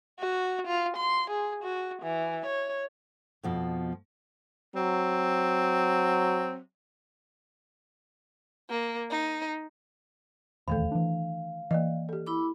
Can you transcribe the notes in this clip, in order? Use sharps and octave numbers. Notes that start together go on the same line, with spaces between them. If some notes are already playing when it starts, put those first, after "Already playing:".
F#4
F4
C6
G#4
F#4
E3
C#5
F2 B2 F3
F#3 C4
A#3
D#4
D#1 E2 D#3 A3 A4 F5
E3 D4
E3 A#3 D5 D#5
G4 A4
E4 B5 D6